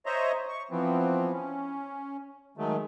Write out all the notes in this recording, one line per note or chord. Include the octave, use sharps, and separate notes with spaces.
C5 C#5 D#5 E5 A#5
C#6
E3 F3 B3 C4
C#4
D#3 F#3 G#3 A3